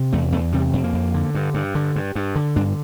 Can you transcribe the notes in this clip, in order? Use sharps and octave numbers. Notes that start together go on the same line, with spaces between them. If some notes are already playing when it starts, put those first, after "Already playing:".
Already playing: C3
E2 A3
E2 A3
C3 G3
F2
A#3
F2
D3
G2
G2
D3
G2
G2
D3
G2 D4